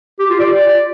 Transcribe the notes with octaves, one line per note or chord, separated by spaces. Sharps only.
G4
F4
D5